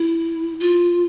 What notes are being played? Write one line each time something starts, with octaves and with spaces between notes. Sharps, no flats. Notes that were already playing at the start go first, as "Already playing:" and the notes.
Already playing: E4
F4